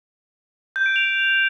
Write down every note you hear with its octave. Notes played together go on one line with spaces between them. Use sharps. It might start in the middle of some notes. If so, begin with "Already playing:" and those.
G6
D7
F7